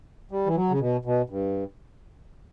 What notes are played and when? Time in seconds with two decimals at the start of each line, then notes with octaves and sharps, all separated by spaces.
0.31 G3
0.46 E3
0.55 F#3
0.70 C#3
0.80 B2
1.05 B2
1.30 G2